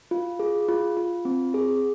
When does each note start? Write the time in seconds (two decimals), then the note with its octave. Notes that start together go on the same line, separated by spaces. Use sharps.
0.11 F4
0.40 G#4
0.69 F4
0.97 F4
1.25 C4
1.54 G#4